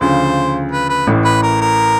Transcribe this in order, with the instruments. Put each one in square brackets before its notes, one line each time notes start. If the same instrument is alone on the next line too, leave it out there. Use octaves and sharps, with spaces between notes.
[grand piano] D2 C#3 F3 [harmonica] C5
[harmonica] B4
B4
[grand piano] A1 A2 E3
[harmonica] B4
A#4
A#4